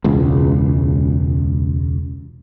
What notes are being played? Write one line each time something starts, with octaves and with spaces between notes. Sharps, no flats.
E1 C#2